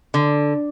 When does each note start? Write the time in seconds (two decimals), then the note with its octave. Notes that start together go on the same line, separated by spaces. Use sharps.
0.14 D3